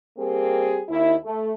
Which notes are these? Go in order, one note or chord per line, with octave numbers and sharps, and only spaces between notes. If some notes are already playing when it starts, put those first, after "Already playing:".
G3 A#3 C4 G4 G#4
D#2 E4
A3